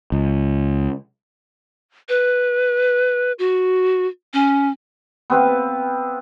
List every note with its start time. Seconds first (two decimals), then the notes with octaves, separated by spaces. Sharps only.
0.12 C#2
2.09 B4
3.39 F#4
4.33 C#4
5.30 B3 C4 B4 F5